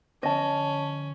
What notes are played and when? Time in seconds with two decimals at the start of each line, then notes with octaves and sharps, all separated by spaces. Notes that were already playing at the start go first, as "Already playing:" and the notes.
0.23 D3 F3 C#4 D#5 A5